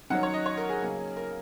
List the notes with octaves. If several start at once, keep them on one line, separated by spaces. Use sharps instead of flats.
D#3 F#3 C#4 F#5
C#5
D#5
C#5
A#4
G#4
C#3 F#3 A#3
A#4